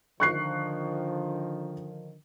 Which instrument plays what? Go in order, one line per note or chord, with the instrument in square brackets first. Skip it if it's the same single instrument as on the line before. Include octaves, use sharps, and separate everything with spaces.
[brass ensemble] D3 D#3 F3 [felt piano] C#6 F#6 C7